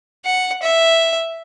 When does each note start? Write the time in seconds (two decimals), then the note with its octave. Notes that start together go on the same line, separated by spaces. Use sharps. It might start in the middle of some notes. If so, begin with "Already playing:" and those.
0.25 F#5
0.62 E5